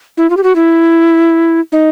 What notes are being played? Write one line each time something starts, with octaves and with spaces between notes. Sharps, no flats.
E4
F4
G4
F#4
E4
D#4